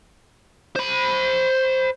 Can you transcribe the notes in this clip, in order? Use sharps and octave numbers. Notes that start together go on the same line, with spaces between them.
C5 B5